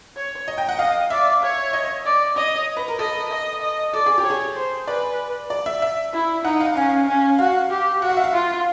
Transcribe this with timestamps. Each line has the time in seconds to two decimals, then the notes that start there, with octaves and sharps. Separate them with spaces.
0.17 C#5
0.48 D#5
0.58 G5
0.69 F#5
0.79 D#5 F5
1.10 D5 E5
1.43 C#5
1.73 D#5
2.05 D5
2.37 C#5 D#5
2.77 B4
2.88 A#4
2.99 A4 D#5
3.31 D#5
3.61 D#5
3.93 A4 D5
4.06 G#4
4.18 G4
4.24 C#5
4.30 G#4
4.56 C5
4.87 B4 D5
5.50 D5
5.66 E5
5.82 E5
6.13 E4
6.44 D#4 F#5
6.60 F5
6.76 C#4 F5
7.07 C#4
7.39 F#4 F5
7.70 G4
8.02 F#4 F#5
8.10 F5
8.17 E5
8.24 F5
8.33 F4